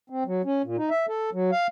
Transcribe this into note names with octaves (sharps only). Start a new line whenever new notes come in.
C4
F#3
C#4
A#2
D#4
E5
A4
F#3
F5